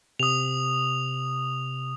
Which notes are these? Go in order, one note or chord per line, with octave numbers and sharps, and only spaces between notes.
C3 D#6 F7